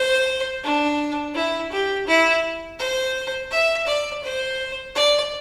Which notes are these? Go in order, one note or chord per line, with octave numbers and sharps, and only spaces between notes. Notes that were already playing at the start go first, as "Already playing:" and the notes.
Already playing: C5
D4
E4
G4
E4
C5
E5
D5
C5
D5